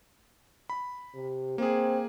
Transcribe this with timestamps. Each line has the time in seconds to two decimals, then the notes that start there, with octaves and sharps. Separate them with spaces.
0.70 B5
1.14 C3
1.58 A#3 C4 G#4